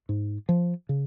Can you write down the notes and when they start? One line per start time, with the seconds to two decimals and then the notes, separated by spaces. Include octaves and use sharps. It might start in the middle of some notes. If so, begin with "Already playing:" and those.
0.09 G#2
0.49 F3
0.89 C#3